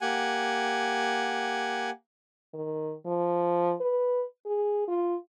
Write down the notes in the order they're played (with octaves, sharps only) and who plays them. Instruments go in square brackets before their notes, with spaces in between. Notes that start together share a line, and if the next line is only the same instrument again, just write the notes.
[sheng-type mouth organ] A#3 G4 F#5 G#5
[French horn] D#3
F3
B4
G#4
F4